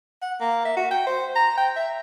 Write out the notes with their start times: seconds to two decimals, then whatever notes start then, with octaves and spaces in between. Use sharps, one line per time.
0.22 F#5
0.40 A#3
0.65 E5
0.77 F#4
0.91 G5
1.07 C5
1.36 A#5
1.58 G5
1.76 E5